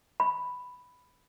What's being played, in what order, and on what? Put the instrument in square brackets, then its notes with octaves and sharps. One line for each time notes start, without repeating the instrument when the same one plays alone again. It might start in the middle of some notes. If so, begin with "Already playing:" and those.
[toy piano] B5